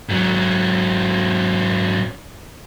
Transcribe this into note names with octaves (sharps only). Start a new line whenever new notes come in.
G#2 F#3